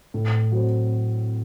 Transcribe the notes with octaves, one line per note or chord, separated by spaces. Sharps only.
A2
F#3 C4